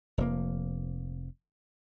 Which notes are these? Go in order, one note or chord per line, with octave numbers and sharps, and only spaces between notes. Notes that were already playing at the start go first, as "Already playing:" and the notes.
F1 F3 A#3